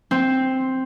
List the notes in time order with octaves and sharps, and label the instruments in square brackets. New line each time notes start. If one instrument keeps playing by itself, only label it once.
[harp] C4